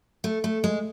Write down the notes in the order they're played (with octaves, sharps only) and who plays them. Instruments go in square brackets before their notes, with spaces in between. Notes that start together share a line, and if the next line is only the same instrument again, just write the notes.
[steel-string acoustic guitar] A3
A3
G#3